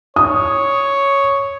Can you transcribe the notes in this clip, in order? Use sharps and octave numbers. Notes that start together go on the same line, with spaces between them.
C#5 D#6